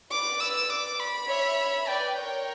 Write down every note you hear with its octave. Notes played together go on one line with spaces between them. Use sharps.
B4 D5 D6
E6
D6
B5
C#5 E5
B4 D5 G5
A#4 C#5